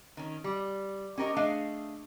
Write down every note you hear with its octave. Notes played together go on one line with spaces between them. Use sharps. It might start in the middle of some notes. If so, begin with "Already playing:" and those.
D#3 C#4
G3
C#4 G4 A#4 C5 D#5
A3 D4 G#4 D#5 F5